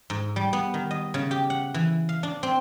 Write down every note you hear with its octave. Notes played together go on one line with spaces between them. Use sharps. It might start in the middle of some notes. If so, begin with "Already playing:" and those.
G#2
G3
B3
D#3
D#5
C#3
G4
F#5
E3
F5
D4
C4